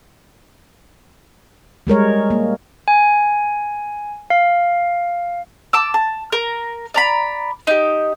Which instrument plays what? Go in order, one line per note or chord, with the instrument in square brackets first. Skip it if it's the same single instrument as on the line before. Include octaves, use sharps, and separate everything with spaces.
[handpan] G3 G#3 A#4 C#5
A#3
[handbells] G#5
F5
[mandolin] A5 D6 E6
A5
A#4
D5 A#5 B5
D#4 G4